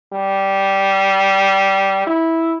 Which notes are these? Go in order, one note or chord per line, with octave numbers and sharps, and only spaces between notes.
G3
E4